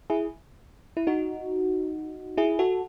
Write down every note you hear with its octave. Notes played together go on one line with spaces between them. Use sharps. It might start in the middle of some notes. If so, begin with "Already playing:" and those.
E4 G#4
E4
D#4 F#4
E4 G#4
F#4 A4